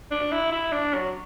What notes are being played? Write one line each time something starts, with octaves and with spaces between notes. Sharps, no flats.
D4
E4
E4
D4
F#3